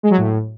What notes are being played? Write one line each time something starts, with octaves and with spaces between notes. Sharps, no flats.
G#3
F#3
A2